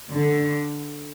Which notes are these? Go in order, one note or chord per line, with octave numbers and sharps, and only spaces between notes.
D3